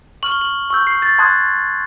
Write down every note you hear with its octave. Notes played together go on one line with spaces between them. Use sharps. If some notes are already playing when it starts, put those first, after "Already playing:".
C#6 F6 F#7
G7
F#7
C#6 E6 G6
C7
A6
A5 C6 D#6 F#6 G#6